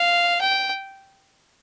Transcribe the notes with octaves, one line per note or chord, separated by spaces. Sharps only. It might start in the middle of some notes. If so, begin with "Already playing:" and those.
Already playing: F5
G5